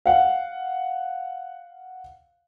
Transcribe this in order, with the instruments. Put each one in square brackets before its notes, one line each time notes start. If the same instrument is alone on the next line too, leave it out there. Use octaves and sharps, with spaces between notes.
[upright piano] F5 F#5